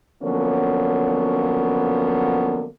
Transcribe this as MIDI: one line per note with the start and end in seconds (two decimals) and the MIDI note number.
0.22 2.65 50
0.22 2.65 53
0.22 2.65 54
0.22 2.65 58
0.22 2.65 59
0.22 2.65 61